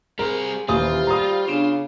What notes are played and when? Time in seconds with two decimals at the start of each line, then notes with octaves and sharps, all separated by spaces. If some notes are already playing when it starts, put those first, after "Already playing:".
0.19 G3 G#4 A#4 C5
0.68 D#1 E3 C#4 F4 G4 C5 C6 D#6
1.07 G3 A#5 D#6
1.48 C#3 B3 C#4 D4